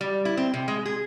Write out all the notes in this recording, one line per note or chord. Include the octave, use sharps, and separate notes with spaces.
G3
E4
C4
C3
G#3
G#4